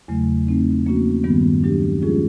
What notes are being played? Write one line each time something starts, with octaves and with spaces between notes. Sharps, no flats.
E2 C#3 F#3 A3
A3 C4 D#4
F3 A#3 C#4 F#4
G2 D#3 G3 B3
F#3 B3 D4 G4
F3 G#3 C#4 F4 G#4